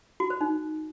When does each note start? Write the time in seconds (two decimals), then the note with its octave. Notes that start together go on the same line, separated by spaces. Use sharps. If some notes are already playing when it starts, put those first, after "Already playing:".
0.20 F#4
0.30 C5
0.41 D#4